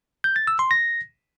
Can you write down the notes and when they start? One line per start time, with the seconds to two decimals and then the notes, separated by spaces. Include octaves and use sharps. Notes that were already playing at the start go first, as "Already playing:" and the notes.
0.24 G6
0.36 A6
0.47 E6
0.59 C6
0.71 A#6